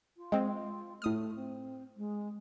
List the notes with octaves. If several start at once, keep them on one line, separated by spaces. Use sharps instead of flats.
F4
G#3 C4
A2 A3 D#6 F6
C4
G#3